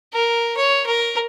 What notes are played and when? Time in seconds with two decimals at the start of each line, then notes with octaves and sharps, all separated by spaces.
0.14 A#4
0.57 C#5
0.86 A#4